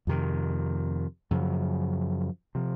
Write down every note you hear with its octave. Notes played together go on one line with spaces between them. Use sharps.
F2 C3 D#3
F#2 C#3 F3
C3 F3